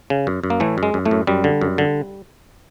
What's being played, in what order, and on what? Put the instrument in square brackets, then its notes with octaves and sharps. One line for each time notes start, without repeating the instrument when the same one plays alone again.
[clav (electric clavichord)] C#3
F#2
F#2
A#3
A2 E3 A3
F#2
G#3
F#2
A2 A3
F#2
F#2 G3
D3
F#2
D3